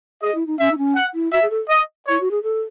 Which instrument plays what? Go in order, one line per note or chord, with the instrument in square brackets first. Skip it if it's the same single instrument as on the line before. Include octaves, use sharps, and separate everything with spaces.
[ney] G#4 [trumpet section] D#5
[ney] E4
D#4
[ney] C#4 [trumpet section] E5
[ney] D#4
C#4
[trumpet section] F#5
[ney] E4
[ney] F#4 [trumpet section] E5
[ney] G#4
A4
[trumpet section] D#5
[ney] E4 [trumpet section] C#5
[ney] F#4
G#4
A4